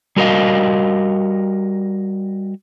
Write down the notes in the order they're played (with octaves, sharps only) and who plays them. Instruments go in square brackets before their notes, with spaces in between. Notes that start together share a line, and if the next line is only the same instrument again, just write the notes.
[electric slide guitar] G3 F#4 A#4 B4 D#5 F5